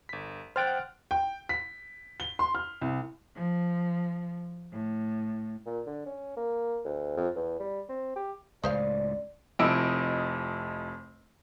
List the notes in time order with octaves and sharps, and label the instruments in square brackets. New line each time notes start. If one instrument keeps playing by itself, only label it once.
[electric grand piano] G1 B6
[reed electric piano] C5 G5 F#6 [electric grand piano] F6 A6 D7
[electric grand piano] F#5
[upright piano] G5
B6
G7
C6
F6
C2
[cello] F3
A2
[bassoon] A#2
D3
C#4
A#3
D2
F2
E2
G3
C4
G4
[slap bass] C#2 A2 [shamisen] G#4 C5 F5 [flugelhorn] D5
[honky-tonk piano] F1 F2 E4 D#5 E6 D7